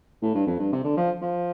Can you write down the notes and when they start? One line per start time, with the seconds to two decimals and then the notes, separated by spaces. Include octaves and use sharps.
0.22 A2
0.35 G2
0.47 F2
0.60 G2
0.72 C3
0.84 D3
0.97 F3
1.22 F3